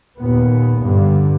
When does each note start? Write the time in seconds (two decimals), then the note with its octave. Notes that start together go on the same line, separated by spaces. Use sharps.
0.19 D#2 A#2 B3
0.80 G2 D3